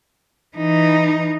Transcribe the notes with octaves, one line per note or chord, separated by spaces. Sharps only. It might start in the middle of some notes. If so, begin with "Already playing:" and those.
E3 D#4